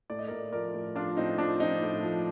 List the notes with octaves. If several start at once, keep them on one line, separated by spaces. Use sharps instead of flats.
A2 D5
D#5
A2 A#4 D5
F3 A#4 D5
A2
F3 D4 F4
A2 C4 D#4
F3 D4
F3 C4 D#4
A2
F3